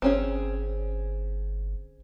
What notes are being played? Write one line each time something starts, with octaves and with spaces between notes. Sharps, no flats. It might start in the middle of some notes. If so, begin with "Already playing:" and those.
G1 C4 C#4 G#4